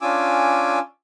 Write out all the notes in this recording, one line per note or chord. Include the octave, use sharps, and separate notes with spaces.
C#4 D4 F4 G#5 D6 E6